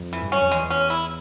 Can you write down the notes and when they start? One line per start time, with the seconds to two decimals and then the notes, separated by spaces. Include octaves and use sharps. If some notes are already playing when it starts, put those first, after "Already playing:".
Already playing: F2
0.13 E3
0.22 G2
0.32 F#2 C#4
0.42 F2
0.51 E2 G#3
0.70 C#4
0.90 E4